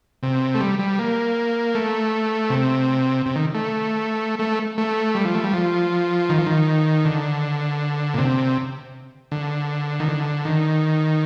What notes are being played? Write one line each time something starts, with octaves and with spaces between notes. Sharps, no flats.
C3
A3
G3
G3
A#3
A3
C3
C3
D#3
A3
A3
A3
G3
F3
A3
G3
F3
D#3
F3
D#3
D3
A#2
C3
D3
D#3
D3
D#3